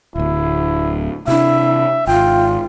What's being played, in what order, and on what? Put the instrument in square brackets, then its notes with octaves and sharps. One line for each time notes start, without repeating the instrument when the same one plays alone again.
[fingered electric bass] D1 D2 [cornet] E4
[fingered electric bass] C3 D4 [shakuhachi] E4 [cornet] E5
[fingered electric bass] G#1 [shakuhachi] F4 [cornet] G5